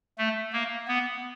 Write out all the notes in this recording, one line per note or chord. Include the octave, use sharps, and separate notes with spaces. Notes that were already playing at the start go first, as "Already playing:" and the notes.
A3
A#3
B3